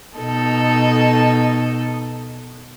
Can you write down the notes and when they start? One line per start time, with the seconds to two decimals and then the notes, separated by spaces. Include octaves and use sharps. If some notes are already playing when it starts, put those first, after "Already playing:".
0.17 B2 D#4 A4